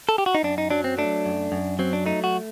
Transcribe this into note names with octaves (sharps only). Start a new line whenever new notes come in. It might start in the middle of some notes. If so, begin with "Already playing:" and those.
A4
G4
F#4
D#4
F#2 D4
D#4
F#3 D4
C4
A3 D4
F#2
F#2
F#3 C4
D4
A3 D#4
F#4